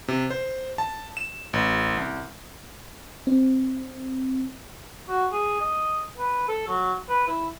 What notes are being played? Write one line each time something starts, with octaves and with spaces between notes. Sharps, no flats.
C3
C5
A5
E7
A1
C2
C4
F#4
G#4
D#5
B4
A4
F#3
B4
E4